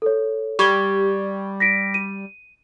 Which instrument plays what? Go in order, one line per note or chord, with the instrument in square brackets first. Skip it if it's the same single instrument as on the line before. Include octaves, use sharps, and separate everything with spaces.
[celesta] A4 C#5
[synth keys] G3 [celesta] C#6 G#6 G7
[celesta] A#6 B6 D7
D#7